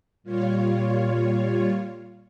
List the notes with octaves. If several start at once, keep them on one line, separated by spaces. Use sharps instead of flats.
A#2 G3 F4 C#5